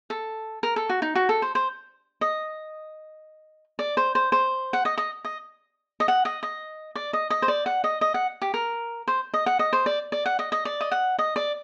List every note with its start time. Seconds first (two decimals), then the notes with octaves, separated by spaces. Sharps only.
0.10 A4
0.63 A#4
0.76 A4
0.89 F#4
1.02 D#4
1.15 F#4
1.29 A4
1.42 C5
1.55 C5
2.21 D#5
3.79 D5
3.97 C5
4.15 C5
4.32 C5
4.73 F#5
4.85 D#5
4.98 D#5
5.25 D#5
6.00 D#5
6.08 F#5
6.25 D#5
6.43 D#5
6.95 D5
7.13 D#5
7.30 D#5
7.42 C5
7.48 D5
7.66 F#5
7.84 D#5
8.01 D#5
8.14 F#5
8.42 G4
8.54 A#4
9.07 C5
9.34 D#5
9.46 F#5
9.59 D#5
9.73 C5
9.86 D5
10.12 D5
10.26 F#5
10.39 D#5
10.52 D#5
10.65 D5
10.81 D#5
10.92 F#5
11.19 D#5
11.36 D5